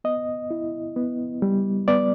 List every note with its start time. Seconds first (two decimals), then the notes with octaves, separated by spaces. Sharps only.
0.04 B3 D#5
0.51 E4
0.96 B3
1.42 G3
1.88 B3 D5